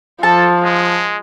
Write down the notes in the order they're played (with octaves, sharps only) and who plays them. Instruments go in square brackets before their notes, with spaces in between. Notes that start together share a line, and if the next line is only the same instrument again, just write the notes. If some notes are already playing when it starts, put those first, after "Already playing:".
[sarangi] F3 [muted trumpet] A4 [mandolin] A5
[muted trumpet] G#3